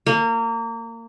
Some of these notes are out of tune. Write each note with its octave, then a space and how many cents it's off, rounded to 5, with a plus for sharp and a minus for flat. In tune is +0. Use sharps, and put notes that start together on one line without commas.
A#3 -25